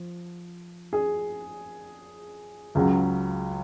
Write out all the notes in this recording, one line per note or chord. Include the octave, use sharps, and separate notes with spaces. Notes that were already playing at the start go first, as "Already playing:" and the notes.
Already playing: F3
G#4
C#2 C#3 F#3